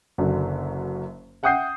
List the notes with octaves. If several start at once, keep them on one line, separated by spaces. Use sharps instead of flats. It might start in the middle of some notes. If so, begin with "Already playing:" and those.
F#1 F#2 D3
E5 F#5 G5 D#6 G6 C7